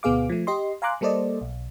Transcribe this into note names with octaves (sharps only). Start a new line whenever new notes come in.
D2 B2 B3 G#4 F5 D6
F3 A3
G4 D#5 C6
F5 G#5 A#5 C6 D6 F#6
G3 A#3 A4 C5 D5 D#5
B1